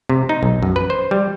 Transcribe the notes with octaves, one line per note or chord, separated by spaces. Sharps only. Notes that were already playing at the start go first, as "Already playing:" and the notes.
C3
D#4
B1
F#2
B4
C5
G3